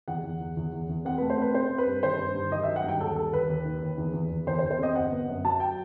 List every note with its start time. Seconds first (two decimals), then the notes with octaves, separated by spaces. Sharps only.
0.08 E2 F#5
0.24 E2
0.41 E2
0.57 E2
0.73 E2
0.89 E2
1.05 C4 F#5
1.18 A3 B4
1.30 C5
1.37 C4 B4
1.54 C4 C5
1.70 C4
1.78 B4
1.87 G2
2.03 D#3 C5
2.19 G2
2.35 G2
2.51 D#3 D#5
2.63 F#3 E5
2.76 F#5
2.84 G2 G5
3.00 D#2 A4
3.16 G3 A4
3.33 D#2 B4
3.49 D#2
3.65 D#3
3.82 D#2
3.98 E2
4.14 E2
4.30 E2
4.47 E2 C5
4.59 C5
4.63 E2
4.71 C5
4.79 C4 D#5
4.95 G1 F#5
5.12 B3
5.28 F#2
5.45 F#3 A5
5.60 G5